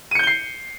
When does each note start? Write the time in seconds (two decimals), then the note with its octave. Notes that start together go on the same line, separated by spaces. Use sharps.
0.11 D#7
0.15 C#7
0.19 G6
0.23 G7
0.27 C7